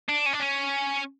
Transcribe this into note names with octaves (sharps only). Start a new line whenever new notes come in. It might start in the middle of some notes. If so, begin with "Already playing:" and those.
D4
C#4
D4
C#4